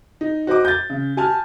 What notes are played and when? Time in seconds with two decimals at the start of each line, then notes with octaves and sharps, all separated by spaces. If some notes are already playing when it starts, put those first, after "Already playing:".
0.21 D#4
0.47 F#4 C5 D#5 D6
0.65 G6 A6
0.90 C#3
1.17 G4 G#5 A5 F6